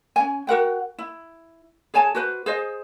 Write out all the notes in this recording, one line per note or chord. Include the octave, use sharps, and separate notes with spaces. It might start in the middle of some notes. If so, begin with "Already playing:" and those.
C#4 G#5
F#4 A#4 F#5 G5
E4
G#4 C#5 G#5 A5
F#4 B4 C5
G#4 C5 D#5